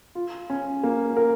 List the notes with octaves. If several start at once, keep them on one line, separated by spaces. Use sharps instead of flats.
F4
C#4
A#3
A#4